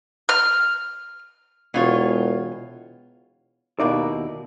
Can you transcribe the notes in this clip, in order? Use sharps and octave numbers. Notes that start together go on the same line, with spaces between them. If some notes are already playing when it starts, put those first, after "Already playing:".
F6
E1 B2 F4 C#5
D#2 B2 A#3 D#4 E4 D5